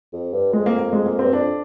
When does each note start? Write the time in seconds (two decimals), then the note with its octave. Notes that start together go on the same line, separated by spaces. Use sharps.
0.13 F2
0.33 G2
0.53 F2 G#3
0.66 A#3
0.79 A#3
0.93 G#3
1.06 A#3
1.19 G2 C4
1.33 F2 D4